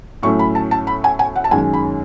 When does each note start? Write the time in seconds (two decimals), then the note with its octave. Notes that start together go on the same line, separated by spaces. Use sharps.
0.23 A2 F#3 A3 C#4 C#6
0.39 B5
0.55 A5
0.71 A5
0.87 B5
1.04 G#5
1.19 G#5
1.36 F#5
1.44 A5
1.51 F#2 D#3 G#3 C#4 G#5
1.73 B5